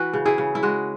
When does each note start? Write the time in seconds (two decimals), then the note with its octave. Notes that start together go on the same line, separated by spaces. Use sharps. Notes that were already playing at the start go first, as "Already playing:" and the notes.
Already playing: E3 F#4 B4
0.13 C#3
0.26 E4 G#4
0.38 C#3
0.55 E4
0.63 G#3 F#4